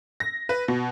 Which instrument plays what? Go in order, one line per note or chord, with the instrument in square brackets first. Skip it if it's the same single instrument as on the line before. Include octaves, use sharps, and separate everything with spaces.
[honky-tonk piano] A#6
B4
B2